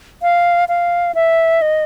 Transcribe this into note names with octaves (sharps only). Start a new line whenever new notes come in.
F5
F5
E5
D#5